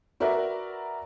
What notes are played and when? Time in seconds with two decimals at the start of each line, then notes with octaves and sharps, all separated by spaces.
0.20 F#4 A#4 B4 D5 E5